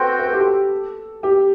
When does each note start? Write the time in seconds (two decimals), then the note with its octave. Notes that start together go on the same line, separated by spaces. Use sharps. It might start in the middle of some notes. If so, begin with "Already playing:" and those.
Already playing: C4 F#4 A4 B4 C5 G5
0.19 B4
0.26 A4
0.33 G4
0.40 A4
1.23 G4